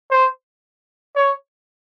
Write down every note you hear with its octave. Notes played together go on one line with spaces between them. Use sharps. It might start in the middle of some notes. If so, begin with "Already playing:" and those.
C5
C#5